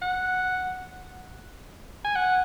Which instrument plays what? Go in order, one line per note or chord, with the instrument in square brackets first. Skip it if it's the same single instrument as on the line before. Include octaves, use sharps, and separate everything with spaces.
[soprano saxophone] F#5
G#5
F#5